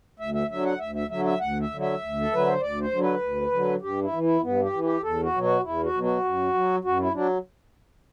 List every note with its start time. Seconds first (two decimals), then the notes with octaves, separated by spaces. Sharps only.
0.19 D2 E5
0.34 E5
0.50 D3 F#3 E5
0.65 F#5
0.79 D2 E5
0.95 E5
1.10 D3 F#3 E5
1.25 E5
1.40 D2 F#5
1.61 E5
1.70 D3 F#3
1.81 E5
2.01 D2
2.21 A4
2.32 D3 F#3 B4
2.48 C5
2.61 D2 D5
2.81 C5
2.92 D3 F#3
3.02 B4
3.22 D2
3.51 D3 F#3
3.82 G2 G4
4.03 E4
4.12 E3
4.23 E4
4.42 G2 B3
4.62 G4
4.73 E3
4.83 G4
5.03 E2 A4
5.23 F#4
5.34 B2 F#3
5.43 F#4
5.63 E2 E4
5.84 F#4
5.94 B2 F#3
6.03 F#4
6.24 F#2
6.54 F#3
6.84 F#2 F#4
6.99 E4
7.14 F#3 D4